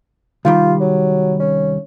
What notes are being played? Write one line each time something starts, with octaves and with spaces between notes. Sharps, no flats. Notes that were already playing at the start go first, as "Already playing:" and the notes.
C2 D#3 G3 F4
F#3
C#4